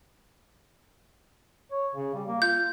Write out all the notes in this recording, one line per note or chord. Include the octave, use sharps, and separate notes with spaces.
C#5
C#3
G3
A#3
F4 G6